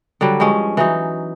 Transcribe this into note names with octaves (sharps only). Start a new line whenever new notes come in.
D3 F#3 G3
G2 F3 G#3 C#4
E3 F#3 D#4